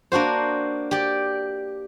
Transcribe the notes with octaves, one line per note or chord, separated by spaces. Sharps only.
A#3 D4 F#4 C5
G4 D5